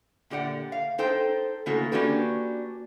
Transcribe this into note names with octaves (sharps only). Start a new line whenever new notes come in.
A#2 D3 G4 D5 F#5
F5
D#4 A4 C5 G5
A2 C#3 A#3 F#4 A4
A#3 C#4 D4 F#4 G4 B4